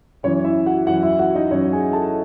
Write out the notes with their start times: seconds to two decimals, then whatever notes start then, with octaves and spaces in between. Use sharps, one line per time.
0.23 F#2 E3 C#4 C#5
0.44 E4 E5
0.66 F#4 F#5
0.87 F#2 E3 F#4 F#5
1.03 E4 E5
1.19 F#4 F#5
1.35 D#4 D#5
1.51 F#2 E3 C#4 C#5
1.72 G#4 G#5
1.93 A4 A5